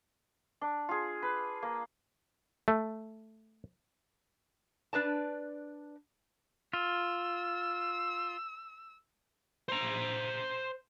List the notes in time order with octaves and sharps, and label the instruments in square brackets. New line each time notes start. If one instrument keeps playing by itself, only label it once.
[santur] D4
F4 G#4
B4
A#3
[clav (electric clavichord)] A3
[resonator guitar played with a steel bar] D4 B4 D5 A5
[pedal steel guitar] F4 [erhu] E6
[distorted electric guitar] C5 A#5